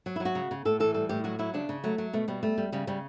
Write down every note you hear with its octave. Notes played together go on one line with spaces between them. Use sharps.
F#3
E4
F#3
F#4
C#3
C#3
A2 A4
E3 A4
G3 A4
A2 G4
F#3 F#4
F#3 E4
C#3 D4
C#3
F#3 A3
F#3
B2 A3
B2 G3
G3 A3
G3
C#3 G3
C#3 G3